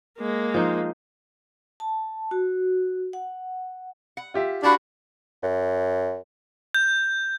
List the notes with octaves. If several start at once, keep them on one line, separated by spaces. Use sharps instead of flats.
G#3 A#3
F3 D#4 C5
A5
F#4
F#5
F#5
F4 G4 E5
D4 E4 F#4 G4 F5
F#2
G6